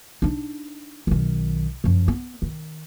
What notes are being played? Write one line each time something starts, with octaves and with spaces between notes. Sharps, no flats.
D4 D#4
B1 D#3
F#2 F3
B3
D#3